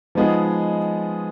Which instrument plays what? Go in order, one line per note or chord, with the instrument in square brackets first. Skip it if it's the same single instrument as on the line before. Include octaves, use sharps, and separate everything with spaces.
[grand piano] F3 G#3 B3 D#4 G#4